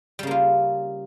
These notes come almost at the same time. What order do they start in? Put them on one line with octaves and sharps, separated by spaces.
G3 C#3 A#3 F4